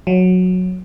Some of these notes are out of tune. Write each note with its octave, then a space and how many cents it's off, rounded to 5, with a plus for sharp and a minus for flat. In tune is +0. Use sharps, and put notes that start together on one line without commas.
F#3 -15